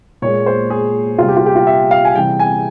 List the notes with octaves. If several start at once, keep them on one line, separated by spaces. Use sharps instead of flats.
A#2 G#3 C#5
C5
G#4
C3 G3 F4
G4
F4
G4
F4
E5
F5
G#5
C3 E3 G3 G5
G#5